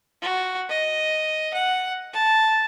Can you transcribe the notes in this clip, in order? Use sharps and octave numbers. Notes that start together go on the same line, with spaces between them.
F#4
D#5
F#5
A5